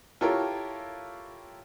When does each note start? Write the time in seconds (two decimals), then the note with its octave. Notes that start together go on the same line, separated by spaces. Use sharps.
0.21 E4 F4 G4 A4 A#4 C#5